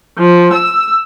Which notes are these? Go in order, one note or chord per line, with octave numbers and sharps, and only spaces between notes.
F3
E6